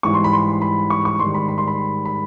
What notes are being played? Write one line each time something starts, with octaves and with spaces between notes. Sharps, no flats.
G#2 E3 G3 C#6
C6
B5
C6
B5
C#6
C#6
G#2 D#3 G3 C6
B5
B5
C6
B5
B5